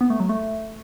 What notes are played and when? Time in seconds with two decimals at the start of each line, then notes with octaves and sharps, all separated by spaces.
0.01 B3
0.10 A3
0.20 F#3
0.29 A3